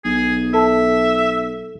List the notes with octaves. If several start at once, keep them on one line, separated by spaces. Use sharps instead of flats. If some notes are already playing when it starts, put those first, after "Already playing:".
B1 G#4
A4 E5